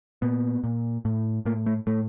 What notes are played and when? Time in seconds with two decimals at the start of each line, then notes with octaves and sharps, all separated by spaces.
0.22 A#2 B3
0.64 A#2
1.05 A2
1.46 A2 A#3
1.66 A3
1.87 A2 A3